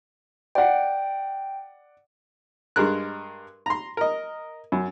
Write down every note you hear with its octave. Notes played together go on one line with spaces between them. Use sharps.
D5 F#5 G5
G2 G#3 A#4 F#6
A#5 C6
A#4 D#5
F#2